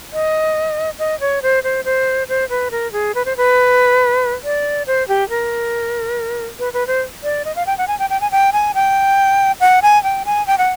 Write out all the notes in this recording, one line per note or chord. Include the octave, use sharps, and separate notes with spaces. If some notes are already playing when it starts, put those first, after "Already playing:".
D#5
D#5
C#5
C5
C5
C5
C5
B4
A#4
G#4
B4
C5
B4
D5
C5
G4
A#4
B4
B4
C5
D5
D#5
F5
G5
F#5
G#5
G5
G5
G#5
G5
G#5
G5
F#5
G#5
G5
G#5
G5
F#5